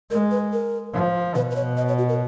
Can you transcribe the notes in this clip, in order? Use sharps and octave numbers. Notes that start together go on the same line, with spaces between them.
G#3 A#4
B4
A#4
F3
B2 B4
B4
C#5
D#5
C#5
F#4
A#4